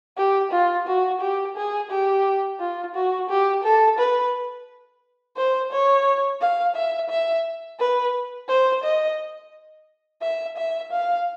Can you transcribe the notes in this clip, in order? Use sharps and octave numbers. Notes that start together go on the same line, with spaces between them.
G4
F4
F#4
G4
G#4
G4
F4
F#4
G4
A4
B4
C5
C#5
F5
E5
E5
B4
C5
D#5
E5
E5
F5